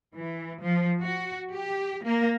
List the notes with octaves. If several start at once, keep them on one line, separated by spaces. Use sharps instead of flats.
E3
F3
F#4
G4
A#3